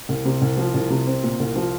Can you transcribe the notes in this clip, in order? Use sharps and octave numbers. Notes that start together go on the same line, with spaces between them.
C2
C3
C2
F3
C2
C3
C4
A#2
C2
F3